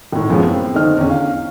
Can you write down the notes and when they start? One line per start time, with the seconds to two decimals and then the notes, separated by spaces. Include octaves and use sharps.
0.12 G#1 A2
0.29 F#2 F3 F#3 G#3 B3 C#4
0.44 C4
0.74 D3 D#3 C5 D#5 F6
0.97 E2 D3 C#4
1.10 F5